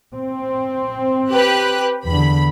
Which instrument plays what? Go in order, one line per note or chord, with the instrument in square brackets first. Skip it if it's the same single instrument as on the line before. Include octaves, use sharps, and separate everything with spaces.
[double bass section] C4
[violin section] G4 B4 F#6
[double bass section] E2 D3 [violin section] B5